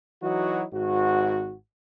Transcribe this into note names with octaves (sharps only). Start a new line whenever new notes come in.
E3 F#3 D#4 E4 F#4
G#1 G#2 F#4